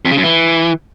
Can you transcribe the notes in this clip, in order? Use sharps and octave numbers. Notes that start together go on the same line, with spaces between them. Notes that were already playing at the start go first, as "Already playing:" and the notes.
F2
C#3
F#2
E3